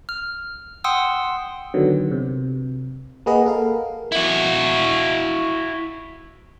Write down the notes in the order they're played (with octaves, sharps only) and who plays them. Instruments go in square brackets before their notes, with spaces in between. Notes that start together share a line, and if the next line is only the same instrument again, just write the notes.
[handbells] F6
F#5 G5 C6 D#6 E6
[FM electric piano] D3 D#3 F#3 B3
C3
A#3 G#4 B4 D#5 F#5
A4 A#4 F5
[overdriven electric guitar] E4 F#4